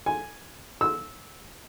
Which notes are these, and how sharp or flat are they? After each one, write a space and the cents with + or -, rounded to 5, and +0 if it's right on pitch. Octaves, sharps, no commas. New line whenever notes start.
G#5 +0
E6 -15